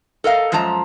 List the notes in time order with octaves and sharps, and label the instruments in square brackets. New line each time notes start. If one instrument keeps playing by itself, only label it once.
[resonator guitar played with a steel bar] A4 A#4 D#5 F5
F#2 F3 G#3 A5 A#5